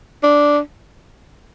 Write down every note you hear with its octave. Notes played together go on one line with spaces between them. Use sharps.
D4